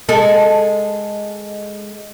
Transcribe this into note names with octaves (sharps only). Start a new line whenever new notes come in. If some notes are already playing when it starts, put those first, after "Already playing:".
G#3 A4